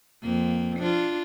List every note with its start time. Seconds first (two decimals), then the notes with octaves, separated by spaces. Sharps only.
0.23 F2 A#3
0.79 D4 F4